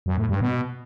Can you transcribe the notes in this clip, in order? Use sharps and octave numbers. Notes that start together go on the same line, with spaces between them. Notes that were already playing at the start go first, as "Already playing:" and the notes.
F#2
A2
G2
B2